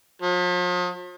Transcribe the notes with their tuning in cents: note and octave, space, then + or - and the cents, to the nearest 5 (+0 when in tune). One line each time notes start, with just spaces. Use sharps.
F3 +45